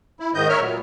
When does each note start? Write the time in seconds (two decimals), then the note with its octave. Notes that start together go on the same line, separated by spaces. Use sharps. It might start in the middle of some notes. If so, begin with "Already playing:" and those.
0.20 E4
0.34 G#2 D#3 D#5 G6
0.49 A#4 C#5 E5 F6
0.61 A#2 F#3 B3